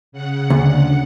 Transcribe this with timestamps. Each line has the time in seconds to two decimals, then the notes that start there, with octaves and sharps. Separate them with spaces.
0.12 C#3 F#5
0.50 D2